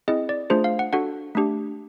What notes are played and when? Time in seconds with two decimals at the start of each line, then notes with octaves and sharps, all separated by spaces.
0.08 C4 E4 G#4 D#5
0.29 D5
0.50 A3 D4 F4 G#4 C5
0.64 F5
0.79 F#5
0.93 D4 F#4 A4 F#5
1.35 A3 D4 G4